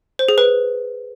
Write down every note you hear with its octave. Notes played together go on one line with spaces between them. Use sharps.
C5
G#4
B4